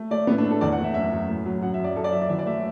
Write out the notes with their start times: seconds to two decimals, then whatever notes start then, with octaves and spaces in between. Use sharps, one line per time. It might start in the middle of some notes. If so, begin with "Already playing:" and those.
Already playing: A3
0.11 A3 D5
0.27 A2 B3
0.38 D4
0.44 A3
0.50 A4
0.61 E2 D5
0.72 F#5
0.79 A3
0.84 E5
0.94 F#2 E5
1.12 F#2
1.28 A2
1.46 F#3
1.62 F#2 F#5
1.74 E5
1.79 F#2
1.84 D5
1.96 F#2 A4
2.04 D5
2.12 F#3 E5
2.22 D5
2.29 E3 E5
2.39 D5
2.46 A3 E5